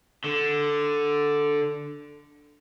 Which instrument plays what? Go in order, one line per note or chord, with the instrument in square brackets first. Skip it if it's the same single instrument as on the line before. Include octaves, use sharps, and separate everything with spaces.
[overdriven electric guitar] D3